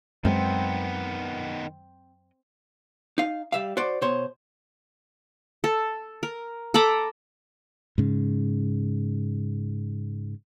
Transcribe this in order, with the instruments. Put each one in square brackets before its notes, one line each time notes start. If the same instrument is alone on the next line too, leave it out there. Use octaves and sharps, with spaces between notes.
[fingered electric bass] F#2 G#3 [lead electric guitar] D#3 B3 [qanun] C4
[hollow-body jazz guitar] D#4 F5
G3 E5 F5
F#4 C5 D5
B2 C5 C#5
[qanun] A4
A#4
A4 A#5 B5 D6
[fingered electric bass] G#2 C#3